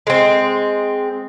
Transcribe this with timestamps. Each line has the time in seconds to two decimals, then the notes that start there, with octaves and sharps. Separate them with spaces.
0.07 G#3 C4